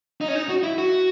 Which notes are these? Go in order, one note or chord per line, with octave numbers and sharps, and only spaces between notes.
D#4
C#4
D#4
F#4
E4
F#4